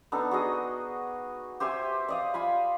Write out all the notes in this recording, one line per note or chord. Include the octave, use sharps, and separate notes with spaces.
B3 D4 D#4 A4
F#4 G#4 D#5
G4 C5 E5 G#5
D5 D#5 F5
F4 G#5 B5